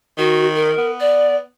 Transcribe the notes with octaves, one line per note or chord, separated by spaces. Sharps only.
D#3 F#4
A#4
B3
D5